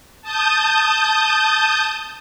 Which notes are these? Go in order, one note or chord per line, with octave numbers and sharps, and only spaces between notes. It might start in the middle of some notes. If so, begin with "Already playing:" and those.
A5 D#6 G6